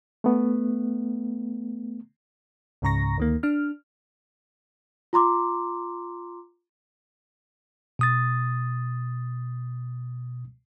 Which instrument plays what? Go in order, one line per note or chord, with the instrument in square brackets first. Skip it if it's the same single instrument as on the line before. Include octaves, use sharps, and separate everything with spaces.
[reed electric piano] A3 B3
[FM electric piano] C#2 G#2 C#3 A#5 C#6 A#6
D2 D#3 A#3
D4 F6
[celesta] F4 A#5 C6 D6
[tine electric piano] B2 D#6 A6